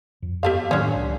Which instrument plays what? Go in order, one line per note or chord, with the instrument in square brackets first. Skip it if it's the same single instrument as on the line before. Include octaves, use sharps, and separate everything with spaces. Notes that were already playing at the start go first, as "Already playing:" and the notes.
[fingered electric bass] F2
[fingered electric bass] F#2 B3 [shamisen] G4 A4 F5
[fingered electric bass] A2 D#3 F#3 [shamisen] C#4 D4
[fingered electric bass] C#2